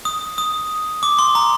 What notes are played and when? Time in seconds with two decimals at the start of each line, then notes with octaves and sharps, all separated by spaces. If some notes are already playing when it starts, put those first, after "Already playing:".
0.05 D#6
0.38 D#6
1.03 D6
1.19 C6
1.35 A#5